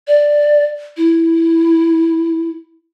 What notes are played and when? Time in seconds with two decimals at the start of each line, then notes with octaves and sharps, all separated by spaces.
0.08 D5
0.97 E4